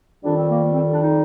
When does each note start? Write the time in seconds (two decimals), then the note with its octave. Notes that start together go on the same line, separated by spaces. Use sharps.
0.24 F2 D#3 G3 D4
0.37 C4
0.50 A#3
0.63 A#3
0.73 C4
0.92 D4
1.02 D#4